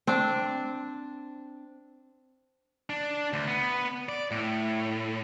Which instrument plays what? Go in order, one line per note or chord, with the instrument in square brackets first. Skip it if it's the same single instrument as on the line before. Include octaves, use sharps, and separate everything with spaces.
[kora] C4 D4
[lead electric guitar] D4
D2
B3
D5
A2